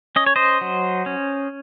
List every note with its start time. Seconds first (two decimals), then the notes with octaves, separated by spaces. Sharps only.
0.16 C#4 D#5
0.26 C#5
0.36 C5 D#5
0.61 F#3
1.06 C#4